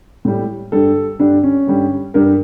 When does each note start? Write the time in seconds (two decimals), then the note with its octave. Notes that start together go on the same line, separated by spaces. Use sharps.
0.25 A2 G3
0.72 G2 D3 G3 A4
1.19 G2 D3 G3 D4
1.43 C#4
1.67 G2 D3 G3
2.14 G2 D3 G3 A#4